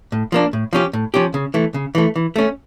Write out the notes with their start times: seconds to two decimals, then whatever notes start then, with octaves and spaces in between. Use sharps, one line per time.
0.12 A2
0.32 F3 A#3 D4
0.53 A2
0.73 F3 C#4 G4
0.93 A2
1.14 F3 C#4 G4
1.34 C#3
1.54 E3 A3
1.74 C#3
1.95 E3 A3
2.16 E3
2.36 A3 C#4